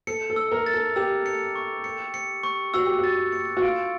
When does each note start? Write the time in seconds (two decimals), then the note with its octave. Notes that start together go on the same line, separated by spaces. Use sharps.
0.07 A4 C#7
0.30 A4
0.36 E6
0.52 A#4
0.66 A6
0.74 A4
0.96 G4 E6
1.26 C#7
1.55 C#6
1.84 C#7
2.14 C#7
2.44 C#6
2.74 F#4 E6
2.86 G4
2.99 F#4 A6
3.32 C#7
3.57 F#4
3.61 F4 D7